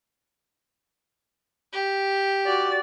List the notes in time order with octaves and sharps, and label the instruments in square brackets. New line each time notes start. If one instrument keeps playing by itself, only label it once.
[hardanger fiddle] G4
[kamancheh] F#4 D5